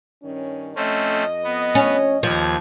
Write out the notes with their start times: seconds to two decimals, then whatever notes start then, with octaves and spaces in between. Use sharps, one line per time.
0.22 G2 D#3 C#4
0.76 F2 A3 C4 C#4 D#5
1.44 B3
1.75 C#4
2.23 D#2 F3 G#6